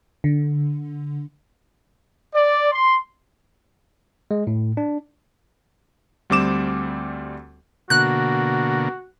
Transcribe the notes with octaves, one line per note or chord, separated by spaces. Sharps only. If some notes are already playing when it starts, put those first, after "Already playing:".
D3
D5
C6
G#3
A2
D4
D2 G3 C4 D6 E7
B2 D3 A#3 F#4 F#6